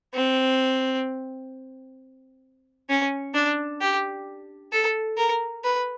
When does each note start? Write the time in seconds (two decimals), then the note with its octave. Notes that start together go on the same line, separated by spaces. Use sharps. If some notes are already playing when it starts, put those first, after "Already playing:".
0.15 C4
2.90 C#4
3.34 D4
3.81 G4
4.72 A4
5.17 A#4
5.64 B4